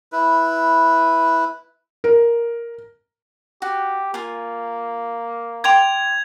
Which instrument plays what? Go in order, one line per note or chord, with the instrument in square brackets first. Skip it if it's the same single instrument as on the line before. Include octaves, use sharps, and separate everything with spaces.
[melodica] E4 B4
[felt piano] A#4
[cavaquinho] F#4 [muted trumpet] G4
[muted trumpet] A#3 [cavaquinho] F4 G#5
[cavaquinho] G5 C6 D6 [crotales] G#6 F7